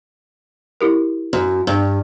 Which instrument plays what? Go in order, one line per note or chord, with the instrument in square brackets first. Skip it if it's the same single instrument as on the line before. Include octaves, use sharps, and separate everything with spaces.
[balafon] E4 G4 A#4
[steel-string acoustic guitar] F#2
G2